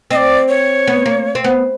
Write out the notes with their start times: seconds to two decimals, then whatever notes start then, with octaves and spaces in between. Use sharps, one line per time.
0.11 C4 D#5
0.16 D5
0.49 C#5
0.88 B3
1.06 A#3
1.35 C4
1.44 B3